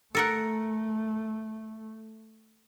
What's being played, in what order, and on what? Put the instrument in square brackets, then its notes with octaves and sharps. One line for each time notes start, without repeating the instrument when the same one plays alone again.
[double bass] A3 [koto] A4 A#4 F#5